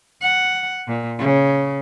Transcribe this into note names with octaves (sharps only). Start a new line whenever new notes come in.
F#5
A#2
C#3